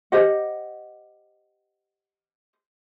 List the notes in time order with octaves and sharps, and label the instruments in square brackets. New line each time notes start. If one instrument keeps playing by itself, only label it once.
[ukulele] G4 C5 D#5 F#5